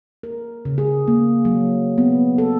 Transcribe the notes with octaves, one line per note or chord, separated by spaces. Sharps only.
A#4
C#3
G#4
A#3
F#3
B3
A4